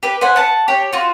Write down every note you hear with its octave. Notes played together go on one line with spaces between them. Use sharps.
G4 B4
B4 C5 F#5 G#5
F#5 A5
G4 C#5
F4 F#4